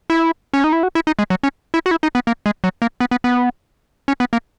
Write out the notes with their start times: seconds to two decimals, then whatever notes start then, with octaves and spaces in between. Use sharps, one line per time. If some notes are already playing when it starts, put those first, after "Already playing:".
0.10 E4
0.53 C#4
0.64 D#4
0.72 E4
0.83 F#4
0.95 E4
1.07 D#4
1.19 G#3
1.30 F#3
1.43 C#4
1.74 E4
1.86 F#4
1.91 E4
2.03 D#4
2.15 B3
2.27 A#3
2.46 G#3
2.64 F#3
2.82 A#3
3.00 B3
3.11 B3
3.24 B3
4.08 C#4
4.20 B3
4.33 A#3